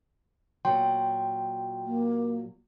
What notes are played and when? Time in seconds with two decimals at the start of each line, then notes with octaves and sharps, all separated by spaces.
0.65 A#2 F#3 G5 C6
1.85 A#3